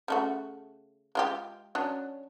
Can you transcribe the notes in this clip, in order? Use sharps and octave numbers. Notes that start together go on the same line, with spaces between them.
C#3 A3 F#4
G#3 F4 G4
F#3 C#4 D4